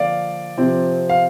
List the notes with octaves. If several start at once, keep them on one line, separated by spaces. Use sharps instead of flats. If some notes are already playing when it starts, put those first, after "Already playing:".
Already playing: D3 F3 A#3 D5 F5
C3 F3 C4
F5